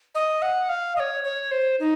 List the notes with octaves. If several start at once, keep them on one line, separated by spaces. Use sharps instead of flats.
D#5
F#5
F5
D#5
C#5
C#5
C5
D#4